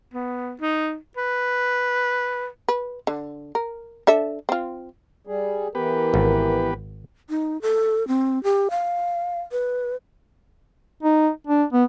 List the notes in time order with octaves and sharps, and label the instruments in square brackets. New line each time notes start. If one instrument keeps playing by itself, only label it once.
[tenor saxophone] B3
D#4
B4
[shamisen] B4
D3
A#4
D4 A4 E5
C4 F4
[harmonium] G3 G#4
[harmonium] E3 [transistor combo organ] B3 G4 B4 [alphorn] A#4
[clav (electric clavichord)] G#1
[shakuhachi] D#4
A4
C4
G4
F5
B4
[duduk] D#4
D4
B3